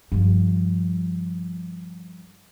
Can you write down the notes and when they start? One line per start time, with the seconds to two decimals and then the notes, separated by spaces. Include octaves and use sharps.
0.12 G2 F3